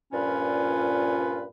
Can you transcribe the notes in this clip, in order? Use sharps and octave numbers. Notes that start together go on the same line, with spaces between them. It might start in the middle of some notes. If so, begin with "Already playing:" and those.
G2 A#2 F3 C#4 F4 B4